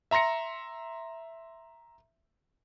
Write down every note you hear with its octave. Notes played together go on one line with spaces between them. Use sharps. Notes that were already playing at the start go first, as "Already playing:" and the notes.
E5 A#5 C6 A#6 C#7